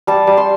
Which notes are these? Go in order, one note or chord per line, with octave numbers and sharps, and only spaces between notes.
G3 A5
G3
C6